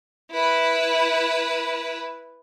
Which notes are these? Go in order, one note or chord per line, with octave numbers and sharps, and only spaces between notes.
E4 B4